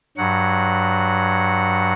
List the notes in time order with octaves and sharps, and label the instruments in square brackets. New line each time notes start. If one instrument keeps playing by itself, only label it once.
[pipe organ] G2 F#3 F#5